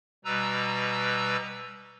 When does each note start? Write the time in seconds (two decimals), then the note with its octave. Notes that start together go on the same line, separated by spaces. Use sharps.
0.25 B2 G3 B4 A#5 E6